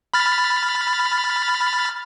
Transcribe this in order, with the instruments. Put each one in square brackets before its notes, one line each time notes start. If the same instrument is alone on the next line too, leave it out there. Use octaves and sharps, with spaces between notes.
[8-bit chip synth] B5 F6 A6